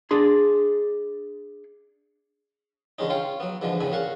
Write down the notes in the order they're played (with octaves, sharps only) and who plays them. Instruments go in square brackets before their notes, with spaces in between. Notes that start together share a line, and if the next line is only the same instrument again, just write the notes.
[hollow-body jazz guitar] D4 G#4 C6
[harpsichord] D3 E3 G#3 C#4 D#4
C#4 F4 C#5 F5 G5
F#3 B3
G#2 B2 D3 E3 F3
E2 A2 C#3 G#5 B5
A#2 C#4 F5 F#5 C#6